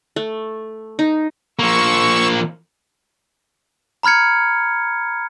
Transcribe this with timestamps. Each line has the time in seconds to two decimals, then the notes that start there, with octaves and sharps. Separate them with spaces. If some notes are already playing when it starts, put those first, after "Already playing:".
0.16 A3
0.99 D#4
1.59 F3 A#3 C#6 E6
4.03 A#5 B5 F6 G#6 C#7